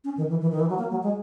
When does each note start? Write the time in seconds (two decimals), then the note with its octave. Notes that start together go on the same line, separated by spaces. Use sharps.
0.04 C#4
0.17 D#3
0.30 E3
0.41 E3
0.52 D#3
0.60 E3
0.70 F#3
0.78 A#3
0.91 F#3
1.03 G#3